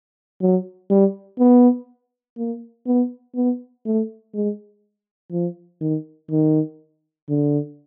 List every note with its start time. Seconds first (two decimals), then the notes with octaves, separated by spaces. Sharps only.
0.41 F#3
0.90 G3
1.39 B3
2.38 A#3
2.87 B3
3.36 B3
3.85 A3
4.35 G#3
5.32 F3
5.81 D#3
6.31 D#3
7.29 D3